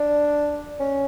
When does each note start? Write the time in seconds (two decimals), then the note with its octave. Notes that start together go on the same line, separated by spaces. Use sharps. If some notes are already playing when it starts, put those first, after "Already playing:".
Already playing: D4
0.80 C#4